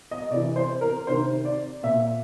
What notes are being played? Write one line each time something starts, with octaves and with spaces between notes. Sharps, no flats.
D#5
C3 E3 D5
C5
A#4
C3 D#3 C5
D5
A#2 E5